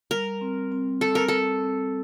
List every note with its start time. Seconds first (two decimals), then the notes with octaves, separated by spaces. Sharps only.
0.11 G3 A#4
0.41 C4
0.72 C4
1.01 C4 A4
1.15 A#4
1.28 C4 A4
1.62 C4